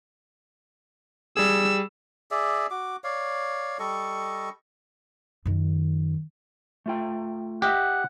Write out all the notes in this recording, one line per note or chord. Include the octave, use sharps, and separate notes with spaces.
G3 G#4 E6
G#4 D5 E5
F#4 D6
C#5 D5 F5
G3 A4 D#5 C#6
F#2 D#3
A3 F4 G5
G4 D#5 E5 F#5